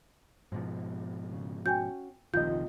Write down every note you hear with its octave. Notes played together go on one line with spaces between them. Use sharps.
G#2 B2 F3 G#3
C#3
C#4 F#4 G5 G#5 G6
F1 A#1 C3 D#3 G#3 F4 D#5 G6